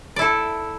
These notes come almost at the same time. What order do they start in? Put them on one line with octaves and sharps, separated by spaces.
D5 E4 A4